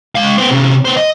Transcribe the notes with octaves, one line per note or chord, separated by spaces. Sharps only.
G#3 F5
B3 C5
C3 C#4
B3 C5
D#5